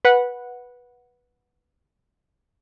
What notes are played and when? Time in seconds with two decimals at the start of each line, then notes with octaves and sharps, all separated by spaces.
0.05 B4 F#5